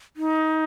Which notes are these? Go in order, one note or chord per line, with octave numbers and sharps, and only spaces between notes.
D#4